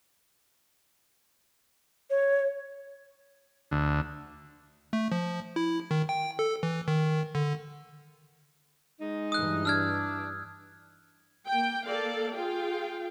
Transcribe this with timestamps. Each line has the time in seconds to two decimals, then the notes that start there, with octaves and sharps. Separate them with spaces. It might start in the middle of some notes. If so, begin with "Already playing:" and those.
2.10 C#5
3.71 D2
4.93 A3
5.12 F3
5.56 E4
5.91 D#3
6.09 G5
6.39 A4
6.63 E3
6.88 D#3
7.35 D3
9.01 G#3 D#4
9.32 G2 E3 D#6 F#6
9.65 D4 E6 F6 G#6
11.47 A#3 G5
11.85 A#3 A4 D5 F5
12.35 F4 G#4 F5 G5